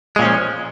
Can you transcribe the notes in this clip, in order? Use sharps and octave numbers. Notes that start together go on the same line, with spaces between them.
A#2 F3 G#3 C#4